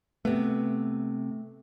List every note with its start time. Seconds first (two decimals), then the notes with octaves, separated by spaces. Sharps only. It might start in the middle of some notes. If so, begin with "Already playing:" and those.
0.25 C3 A3 B3